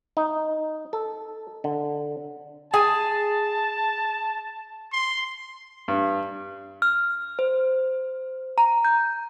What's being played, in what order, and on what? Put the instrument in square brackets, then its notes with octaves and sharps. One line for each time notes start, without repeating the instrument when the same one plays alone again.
[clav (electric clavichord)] D#4
A4
D3
[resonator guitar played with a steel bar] G#4 G#5 [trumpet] A5
[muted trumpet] C6
[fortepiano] G2
[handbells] F6
C5
A#5
G6